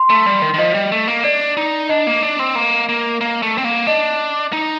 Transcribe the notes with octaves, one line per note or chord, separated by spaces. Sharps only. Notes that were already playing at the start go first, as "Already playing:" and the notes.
Already playing: C6
A3
G3
D#3
D#3
F3 D#5
G3
A3
A#3
D4 D5
D#4
D4 D#5
A#3
D4
C4
A#3
A#3
A#3
A3
C4
A#3
D4 D#5
D#4